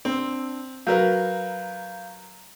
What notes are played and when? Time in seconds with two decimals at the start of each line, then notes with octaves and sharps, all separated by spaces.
0.05 C4 D4
0.87 F#3 A#4 B4 F5 G6